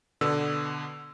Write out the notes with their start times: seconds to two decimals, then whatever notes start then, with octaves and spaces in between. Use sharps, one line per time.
0.21 B2 D3 B3 E6